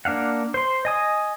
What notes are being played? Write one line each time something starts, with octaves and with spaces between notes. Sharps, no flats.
A#3 D4 F5 F#5
C5 C6
D#5 G#5 D#6